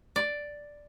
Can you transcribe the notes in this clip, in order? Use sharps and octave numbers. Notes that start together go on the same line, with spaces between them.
D5